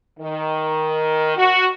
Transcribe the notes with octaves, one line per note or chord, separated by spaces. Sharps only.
D#3
F#4